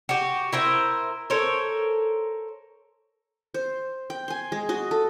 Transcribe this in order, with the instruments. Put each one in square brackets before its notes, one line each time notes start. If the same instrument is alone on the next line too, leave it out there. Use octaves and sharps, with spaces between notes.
[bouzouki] F#4 G4
E4 A#4 C5
A4 A#4 C5 C#5
[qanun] C5
G5
G#5 C6
G#3
F#4 D#5
A4